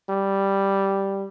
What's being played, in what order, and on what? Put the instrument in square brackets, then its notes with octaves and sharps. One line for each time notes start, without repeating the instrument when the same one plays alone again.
[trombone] G3